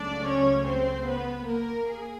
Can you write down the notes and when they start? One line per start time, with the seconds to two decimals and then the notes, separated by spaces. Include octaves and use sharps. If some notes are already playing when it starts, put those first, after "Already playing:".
Already playing: C#2 C#3 F#3 A3 D4 D5
0.24 C#4 C#5
0.65 C4 C5
1.06 B3 B4
1.47 A#3 A#4
1.87 G#4